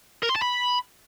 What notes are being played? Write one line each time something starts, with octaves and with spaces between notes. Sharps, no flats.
A#4
C6
A5
B5